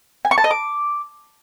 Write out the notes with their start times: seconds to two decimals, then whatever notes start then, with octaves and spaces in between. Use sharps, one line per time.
0.25 G#5
0.31 C#6
0.38 A5
0.44 D#5
0.51 D6